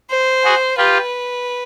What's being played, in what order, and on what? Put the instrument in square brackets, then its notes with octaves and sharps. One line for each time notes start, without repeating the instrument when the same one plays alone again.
[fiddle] C5
[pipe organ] F#4 G#4
[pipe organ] F4 G4 [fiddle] B4